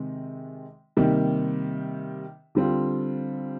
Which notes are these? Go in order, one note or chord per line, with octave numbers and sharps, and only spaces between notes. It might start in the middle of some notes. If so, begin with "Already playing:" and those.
Already playing: C3 D#3 G#3
C3 D#3 G3 A#3
D3 G3 C4 F4